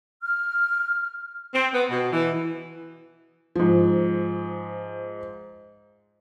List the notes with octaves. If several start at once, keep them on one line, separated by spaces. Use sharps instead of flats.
F6
C4
B3
B2
E3
G#2 F3